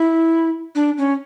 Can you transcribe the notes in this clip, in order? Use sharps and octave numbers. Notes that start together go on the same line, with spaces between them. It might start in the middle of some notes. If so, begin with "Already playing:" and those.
Already playing: E4
D4
C#4